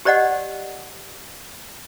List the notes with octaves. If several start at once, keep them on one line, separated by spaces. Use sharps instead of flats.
G4 C5 D5 D#5 F#5